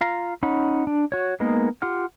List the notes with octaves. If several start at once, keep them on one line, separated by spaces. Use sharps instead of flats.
F4 F5 A#5
C#4 D#4 F#5 B5
D4
F#4 C#5
G#3 A#3 B3 D#4 A#4
F4 G4 F#5 F6